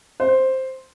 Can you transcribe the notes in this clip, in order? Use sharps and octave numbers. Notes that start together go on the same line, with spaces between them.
C5